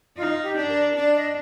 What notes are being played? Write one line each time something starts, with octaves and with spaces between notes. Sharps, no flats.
D#4 F4
G4
D4
A#4
D4 D5
D#5